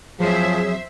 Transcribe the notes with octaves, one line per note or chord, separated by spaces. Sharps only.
F2 F3 F#3 G#4 C5 C#5 E5